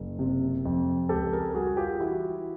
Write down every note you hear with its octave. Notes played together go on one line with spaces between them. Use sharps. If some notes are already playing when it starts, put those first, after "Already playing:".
Already playing: F#1
C3
F2
C#2 G4 A4
G#4 A#4
G3 F#4 G#4
F4 G4
E3 E4 F#4